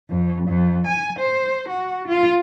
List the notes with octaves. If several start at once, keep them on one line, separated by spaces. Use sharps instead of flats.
F2
F2
G#5
C5
F#4
F4